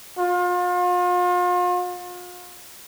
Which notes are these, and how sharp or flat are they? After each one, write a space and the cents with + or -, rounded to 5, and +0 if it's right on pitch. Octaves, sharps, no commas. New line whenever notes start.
F4 +40